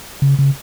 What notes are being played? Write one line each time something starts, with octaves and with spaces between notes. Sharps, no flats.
C#3
C#3